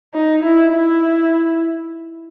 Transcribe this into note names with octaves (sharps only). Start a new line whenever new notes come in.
D#4
E4
E4